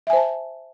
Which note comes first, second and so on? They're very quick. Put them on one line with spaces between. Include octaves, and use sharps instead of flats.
E5 G#5 C5 A5